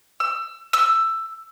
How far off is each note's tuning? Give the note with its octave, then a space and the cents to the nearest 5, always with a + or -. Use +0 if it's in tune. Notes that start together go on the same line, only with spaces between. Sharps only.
E6 +30
E6 +10